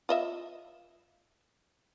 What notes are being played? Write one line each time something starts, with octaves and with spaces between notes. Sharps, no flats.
F4 D#5 E5